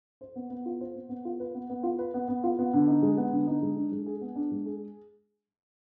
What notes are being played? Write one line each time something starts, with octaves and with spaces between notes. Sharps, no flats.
C5
B3
B3
F4
C5
B3
B3
F4
B4
B3
B3
F4
B4
B3
B3
F4
B3
D3
D#4
G#3
B3
D3
D#4
G#3
D4
G#3
G#4
B3
D4
G#3
G#4